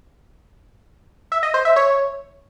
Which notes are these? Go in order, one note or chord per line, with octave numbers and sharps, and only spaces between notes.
E5
D#5
C5
E5
C#5